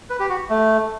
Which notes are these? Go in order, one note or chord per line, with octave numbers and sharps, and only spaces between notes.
B4
G4
F#4
A3